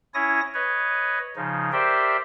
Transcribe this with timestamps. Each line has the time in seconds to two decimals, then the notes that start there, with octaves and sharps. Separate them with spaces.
0.14 C#4 E4 C#5 D#6 A#6
0.54 B4 C#5 D#5
1.36 C#3 F3 D#4
1.72 G4 A#4 C5 D5 E5 G5